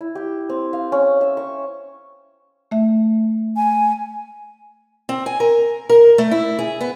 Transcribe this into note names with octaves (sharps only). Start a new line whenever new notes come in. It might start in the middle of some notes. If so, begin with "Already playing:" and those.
E4
G4
C4
F5
C#4
E5
C#6
A3 E5
G#5
C4
G#5
A#4
A#4
A3
E4
G#4
B3